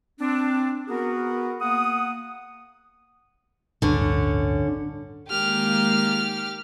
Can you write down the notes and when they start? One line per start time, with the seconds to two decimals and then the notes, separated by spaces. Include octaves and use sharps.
0.20 C4 D4
0.88 B3 F#4 G#4 A#4
1.61 A#3 F#5 D#6
3.82 A1 D2 G2 D3 C#4
5.28 D#3 G#3 A#3 G4 F6